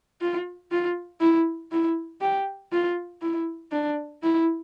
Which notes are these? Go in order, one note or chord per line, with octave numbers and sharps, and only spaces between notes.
F4
F4
E4
E4
G4
F4
E4
D4
E4